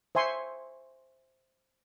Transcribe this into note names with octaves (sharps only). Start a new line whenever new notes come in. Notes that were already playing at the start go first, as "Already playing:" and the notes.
C5 E5 G#5 C6 C#6